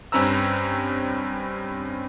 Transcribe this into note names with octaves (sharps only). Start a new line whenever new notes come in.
G2 C4 C#4 B4 A#5 E6